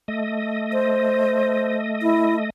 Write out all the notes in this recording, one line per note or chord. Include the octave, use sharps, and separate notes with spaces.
A3 D#5
C5
E4